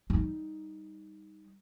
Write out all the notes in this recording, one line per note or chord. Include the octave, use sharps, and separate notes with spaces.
G3 D#4